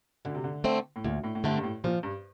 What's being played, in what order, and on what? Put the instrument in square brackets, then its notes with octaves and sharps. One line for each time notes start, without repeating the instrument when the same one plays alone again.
[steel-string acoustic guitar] D2 [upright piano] D3
[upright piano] C3
D3
[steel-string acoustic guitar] D3 A3 C4
[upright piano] A2
[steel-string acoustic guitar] D2 [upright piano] A#2
[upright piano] A2
A2
[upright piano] G2 [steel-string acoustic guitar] D3 A3 C4
[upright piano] G2
A2
[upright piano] A#2 [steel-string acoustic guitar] F3
[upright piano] G2